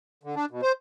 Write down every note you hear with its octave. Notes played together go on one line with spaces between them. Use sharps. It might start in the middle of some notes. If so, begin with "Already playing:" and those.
D3
D4
B2
C5